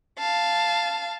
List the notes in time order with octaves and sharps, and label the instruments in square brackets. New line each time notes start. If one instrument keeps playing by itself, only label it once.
[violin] F5 A5